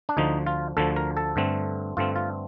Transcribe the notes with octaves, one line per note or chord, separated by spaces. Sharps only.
D4
D2 D3 F3 D#4
F4
D2 D3 F3 A4
A#4
A4
G2 D3 A3 C4
G2 D3 A3 C4 F4
F4